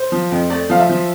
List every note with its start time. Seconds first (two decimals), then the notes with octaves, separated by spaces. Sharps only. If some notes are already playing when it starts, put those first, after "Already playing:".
Already playing: C5
0.12 F3
0.32 F2
0.50 A3 D5
0.70 F3 F5
0.80 E5
0.89 F3